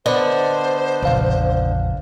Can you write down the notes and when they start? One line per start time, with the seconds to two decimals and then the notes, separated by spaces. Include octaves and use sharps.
0.06 D3 B3 D4 C5 D#5
1.02 A#1 F2 C#3 F5